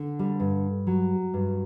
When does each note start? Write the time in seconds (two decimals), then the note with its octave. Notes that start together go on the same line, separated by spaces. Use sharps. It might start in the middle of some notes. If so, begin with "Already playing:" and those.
Already playing: D3
0.19 G3
0.40 G2
0.87 F#3
1.34 G2